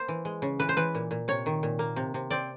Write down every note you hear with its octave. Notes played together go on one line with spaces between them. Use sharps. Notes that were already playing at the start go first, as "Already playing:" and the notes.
Already playing: A#3 C5
E3
G#3
C#3
E3 B4
C5
E3 B4
A#2
A#2
C3 C#5
D#3
A#2
A#3
C3
C3
C4 D5